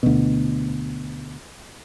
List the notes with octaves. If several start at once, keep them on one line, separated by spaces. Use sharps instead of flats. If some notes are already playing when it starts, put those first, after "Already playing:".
D2 B2